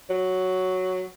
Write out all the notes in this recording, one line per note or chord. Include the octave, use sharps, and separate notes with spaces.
F#3